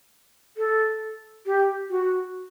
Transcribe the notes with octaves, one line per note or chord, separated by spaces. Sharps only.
A4
G4
F#4